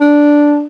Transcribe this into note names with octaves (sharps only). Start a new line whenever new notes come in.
D4